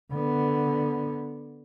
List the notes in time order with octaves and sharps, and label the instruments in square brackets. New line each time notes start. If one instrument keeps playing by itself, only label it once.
[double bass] D3 B3